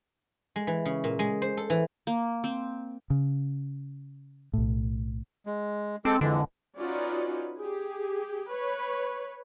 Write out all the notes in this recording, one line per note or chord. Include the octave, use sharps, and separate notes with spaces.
G#3
E3
C#3
A#2
G#3
C5
A4
E3
A#3
C4
C#3
B1 A2
G#3
G#3 C4 A4 D6
F2 D3 E3 G#3
C#4 D#4 F4 F#4 B4 D5
G4 G#4
B4 C#5